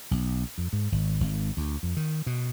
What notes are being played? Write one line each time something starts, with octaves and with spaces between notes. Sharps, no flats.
B1
F2
G#2
G#1
G#1
D2
F2
D#3
B2